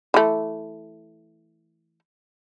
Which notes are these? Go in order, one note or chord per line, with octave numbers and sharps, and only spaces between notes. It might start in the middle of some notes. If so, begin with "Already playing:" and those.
E3 A3